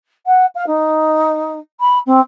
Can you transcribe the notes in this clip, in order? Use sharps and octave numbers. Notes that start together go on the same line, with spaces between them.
F#5
F5
D#4
B5
C4